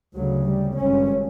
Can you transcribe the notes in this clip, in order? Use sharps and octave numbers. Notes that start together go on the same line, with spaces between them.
D2 C#3 F#3
G3
G#1 G2 C#4